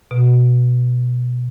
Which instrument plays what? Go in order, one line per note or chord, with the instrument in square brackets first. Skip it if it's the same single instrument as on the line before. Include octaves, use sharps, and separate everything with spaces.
[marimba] B2